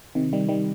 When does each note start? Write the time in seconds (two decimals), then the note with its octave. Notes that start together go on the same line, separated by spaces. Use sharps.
0.15 C3 D#3
0.33 D#3 G3
0.49 D#3 G3